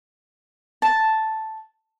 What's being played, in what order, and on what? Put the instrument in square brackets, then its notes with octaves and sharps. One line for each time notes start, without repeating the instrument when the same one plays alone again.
[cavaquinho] A5